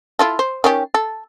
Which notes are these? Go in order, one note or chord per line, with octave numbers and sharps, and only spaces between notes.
E4 F4 A4
C5
D#3 C#4 G4
A4